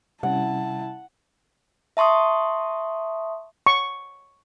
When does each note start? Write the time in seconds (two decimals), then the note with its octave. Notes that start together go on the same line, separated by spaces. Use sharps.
0.23 C3 G3 C#4 E4 F#5 A5
1.97 E5 A5 C6 C#6 D#6
3.66 C#6